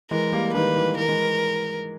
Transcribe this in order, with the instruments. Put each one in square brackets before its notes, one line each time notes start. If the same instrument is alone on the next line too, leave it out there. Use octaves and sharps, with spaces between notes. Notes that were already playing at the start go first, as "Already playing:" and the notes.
[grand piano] E3 G#3 [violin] A#4
[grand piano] G3 A#3
[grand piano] D#3 G3 [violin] B4
[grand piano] E3
[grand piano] E3 [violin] A#4
[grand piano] E3 G#3